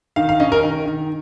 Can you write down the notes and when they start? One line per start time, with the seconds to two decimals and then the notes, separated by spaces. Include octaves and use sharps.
0.16 D#3 F5
0.29 F5
0.40 C#4 D#5
0.52 A#4
0.63 D#3
0.86 D#3